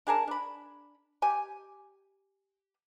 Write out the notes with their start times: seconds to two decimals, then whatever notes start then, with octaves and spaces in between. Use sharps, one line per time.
0.07 D4 G#4 A#4 A5
0.28 D4 B5
1.22 G4 G#5